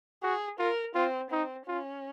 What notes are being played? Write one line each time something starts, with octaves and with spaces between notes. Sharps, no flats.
F#4 G#4
F4 A#4
C4 F4
C4 D#4
C#4 F4